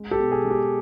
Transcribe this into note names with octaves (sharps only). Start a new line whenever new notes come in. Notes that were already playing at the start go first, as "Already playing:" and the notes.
Already playing: G#3
G4 A4
B2
G#4
G#3
G4